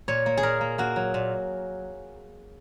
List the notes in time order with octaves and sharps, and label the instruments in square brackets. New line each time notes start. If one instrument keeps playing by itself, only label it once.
[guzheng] A#2 C#5
A#3
G#4
A#2 A#4
A#3
A#3 F#4
F#3
A#2